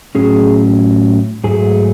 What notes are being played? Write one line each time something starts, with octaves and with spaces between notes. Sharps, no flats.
A2 F#3 C#4 G#4
G#2 F#3 A3 G#4